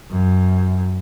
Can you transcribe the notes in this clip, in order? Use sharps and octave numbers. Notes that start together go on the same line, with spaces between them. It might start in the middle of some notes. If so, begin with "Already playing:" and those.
F#2